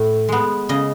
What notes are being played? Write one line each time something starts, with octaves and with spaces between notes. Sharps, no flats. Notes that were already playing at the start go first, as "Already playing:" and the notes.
Already playing: A2
G#3 B3
C#3 D#5